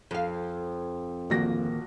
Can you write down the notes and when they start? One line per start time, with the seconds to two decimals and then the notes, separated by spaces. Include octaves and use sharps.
0.11 F2 F5
1.30 D1 A#1 D#3 A#3 F#4 A#6